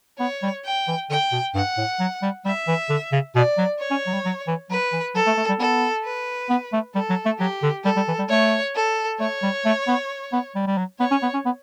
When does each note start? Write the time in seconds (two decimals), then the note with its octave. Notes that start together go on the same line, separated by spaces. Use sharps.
0.19 B3 C#5
0.42 G3
0.64 G5
0.88 E3
1.10 D3 G5
1.32 B2
1.55 G2 F#5
1.77 A2
2.00 F#3
2.22 G3
2.45 G3 E5
2.67 E3
2.90 D3
3.12 C#3
3.35 B2 D5
3.58 F#3
3.80 C#5
3.91 C#4
4.07 F#3
4.14 G3
4.25 F#3
4.47 E3
4.70 F#3 B4
4.92 E3
5.15 F#3 A4
5.27 A3
5.37 A3
5.48 G3
5.60 B3 A4
6.04 B4
6.50 B3
6.73 A3
6.95 G3 A4
7.10 F#3
7.26 A3
7.39 F#3 G4
7.63 D3
7.85 G3 A4
7.96 G3
8.08 E3
8.19 G3
8.30 A3 C#5
8.75 A4
9.20 A3 C#5
9.43 G3
9.65 A3
9.88 B3
10.32 B3
10.55 G3
10.67 G3
10.77 F#3
11.00 B3 C#5
11.11 C#4
11.23 B3
11.34 C#4
11.45 B3